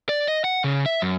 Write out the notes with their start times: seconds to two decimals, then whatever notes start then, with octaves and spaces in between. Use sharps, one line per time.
0.09 D5
0.28 D#5
0.44 F#5
0.64 C#3
0.86 E5
1.02 F#2